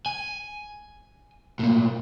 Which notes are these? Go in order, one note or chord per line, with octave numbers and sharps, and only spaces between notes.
G#5
A2 A#3